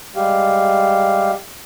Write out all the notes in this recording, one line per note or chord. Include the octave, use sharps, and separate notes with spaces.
G3 G#3 G4 F5